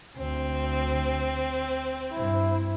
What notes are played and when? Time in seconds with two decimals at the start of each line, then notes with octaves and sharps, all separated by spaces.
0.17 D2 C4
2.12 G2 E4